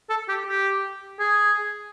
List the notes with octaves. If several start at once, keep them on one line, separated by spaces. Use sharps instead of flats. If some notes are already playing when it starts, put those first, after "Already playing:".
A4
G4
G4
G#4